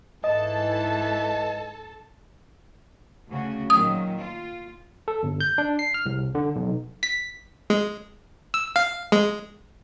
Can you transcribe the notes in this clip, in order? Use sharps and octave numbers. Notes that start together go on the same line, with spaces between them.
G#2 E3 A4 D#5 A5
D2 C#3 F#4
A#2 D#3 F#3 D#6
F4
A4
G1
G6
D4
C7
F6
C2
D3
B1
B6
G#3
E6
F5
G#3